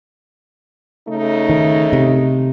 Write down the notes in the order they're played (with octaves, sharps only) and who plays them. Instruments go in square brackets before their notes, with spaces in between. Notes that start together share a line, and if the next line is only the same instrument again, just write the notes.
[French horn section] C#3 A3 D#4
[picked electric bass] D#3
C3